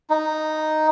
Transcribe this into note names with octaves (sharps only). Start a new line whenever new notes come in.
D#4